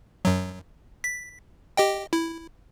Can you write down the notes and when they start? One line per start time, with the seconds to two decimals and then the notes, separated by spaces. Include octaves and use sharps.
0.25 F#2 F#3
1.04 B6
1.77 G4 D#5 G5
2.13 E4